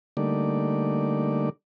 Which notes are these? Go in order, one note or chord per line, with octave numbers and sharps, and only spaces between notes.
D3 G3 A3 A#3 D#4 D5